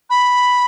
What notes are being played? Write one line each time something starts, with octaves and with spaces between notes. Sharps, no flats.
B5